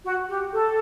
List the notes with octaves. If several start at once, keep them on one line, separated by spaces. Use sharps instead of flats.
F#4
G4
A4